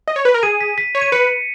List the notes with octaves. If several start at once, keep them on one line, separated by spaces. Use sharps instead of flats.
D#5
C#5
B4
A#4
G#4 D#7
B6
B6
C#5
D#7
B4 C#7